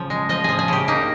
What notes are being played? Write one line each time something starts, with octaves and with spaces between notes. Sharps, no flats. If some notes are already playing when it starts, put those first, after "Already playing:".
Already playing: C#3 F3
G#3
F3 D#5
F3 G#4
G#4
C#3 G4
A#3 D#4